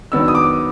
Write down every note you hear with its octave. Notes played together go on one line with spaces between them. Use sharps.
D#3 F#3 B3 D4 E6
D#6
D6